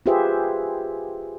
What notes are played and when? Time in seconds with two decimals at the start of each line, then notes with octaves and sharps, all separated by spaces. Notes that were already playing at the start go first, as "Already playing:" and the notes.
0.06 F4 G4 G#4 B4 C5 E5